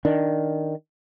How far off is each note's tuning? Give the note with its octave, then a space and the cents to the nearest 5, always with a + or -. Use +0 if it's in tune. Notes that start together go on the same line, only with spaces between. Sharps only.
D#3 +0 D4 +0